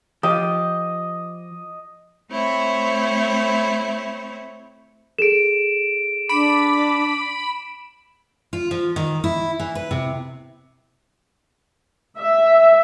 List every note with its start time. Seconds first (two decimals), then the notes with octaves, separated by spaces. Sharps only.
0.23 F3 G4 D#5
2.31 A3 C4 E4 C#5
5.19 G#4 A4 D7 E7
6.29 D4 B5 D6 D7
8.53 F4
8.71 F3
8.96 D#3
9.24 E4
9.60 E3
9.75 B4
9.91 C3
12.18 E5